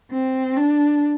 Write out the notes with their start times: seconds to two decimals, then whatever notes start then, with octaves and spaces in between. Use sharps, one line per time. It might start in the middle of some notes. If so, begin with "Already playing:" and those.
0.12 C4
0.57 D4